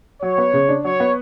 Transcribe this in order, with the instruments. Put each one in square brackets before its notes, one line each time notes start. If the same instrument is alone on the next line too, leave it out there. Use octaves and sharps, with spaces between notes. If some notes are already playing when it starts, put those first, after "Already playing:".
[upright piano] F#3 [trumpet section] C#5
[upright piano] B3
C#3
D4
[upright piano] F#3 [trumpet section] C#5
[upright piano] B3